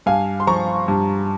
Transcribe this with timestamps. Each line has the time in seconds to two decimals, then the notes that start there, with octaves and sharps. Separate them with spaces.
0.06 G2 F5 G#5
0.40 C6
0.47 F3 A#5 C#6
0.88 G2